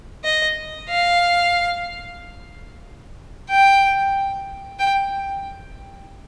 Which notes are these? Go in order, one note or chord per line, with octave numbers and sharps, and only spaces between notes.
D#5
F5
G5
G5